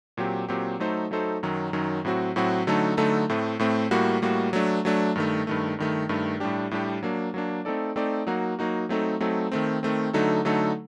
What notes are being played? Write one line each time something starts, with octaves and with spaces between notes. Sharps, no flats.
A#2 F#3 C4 G4
A#2 F#3 C4 G4
F#3 A3 D#4 A4 C5
F#3 A3 D#4 A4 C5
F#2 D#3 F#3
F#2 D#3 F#3
A2 F#3 C4 F#4
A2 F#3 C4 F#4
D3 F#3 A3 D#4 A4
D3 F#3 A3 D#4 A4
A2 A3 C4
A2 A3 C4
A2 G3 A#3 F#4
A2 G3 A#3 F#4
F#3 A3 D4
F#3 A3 D4
G2 D#3 A3
G2 D#3 A3
G2 D#3 A3
G2 D#3 A3
A2 G3 D4 G4
A2 G3 D4 G4
F#3 A#3 D4
F#3 A#3 D4
A3 C4 D#4 A4 D5
A3 C4 D#4 A4 D5
F#3 A#3 D#4 F#4
F#3 A#3 D#4 F#4
F#3 A3 C4 D#4 A4
F#3 A3 C4 D#4 A4
D#3 A3 C4
D#3 A3 C4
D3 F#3 A3 D#4 A4
D3 F#3 A3 D#4 A4